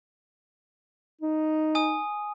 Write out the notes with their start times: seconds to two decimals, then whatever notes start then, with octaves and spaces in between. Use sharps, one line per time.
1.21 D#4
1.75 G#5 D#6